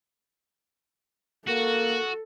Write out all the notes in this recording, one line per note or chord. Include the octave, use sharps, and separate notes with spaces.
A#3 F#4 A4